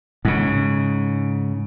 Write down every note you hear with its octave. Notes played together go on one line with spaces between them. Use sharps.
G#2 C#3